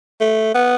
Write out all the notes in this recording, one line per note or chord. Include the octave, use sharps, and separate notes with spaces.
A3
B3